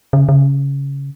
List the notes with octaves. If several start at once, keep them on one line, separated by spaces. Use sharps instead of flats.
C#3
C#3